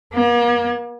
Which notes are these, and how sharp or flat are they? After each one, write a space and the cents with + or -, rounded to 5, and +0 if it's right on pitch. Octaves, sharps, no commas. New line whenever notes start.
A#3 +45